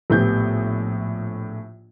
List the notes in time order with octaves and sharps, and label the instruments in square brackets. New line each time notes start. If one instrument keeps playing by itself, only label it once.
[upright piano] A#1 A2 B3 G4 G6